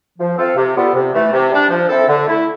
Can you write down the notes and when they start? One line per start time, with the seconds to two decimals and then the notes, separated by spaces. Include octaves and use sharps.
0.19 F3
0.37 C4 F4 A4
0.56 C3
0.75 G3 B3 F4 A4
0.94 C3
1.13 E3 A3
1.32 C3
1.51 G3 D4
1.70 F3
1.89 C4 E4 A4
2.08 D3
2.26 A3 E4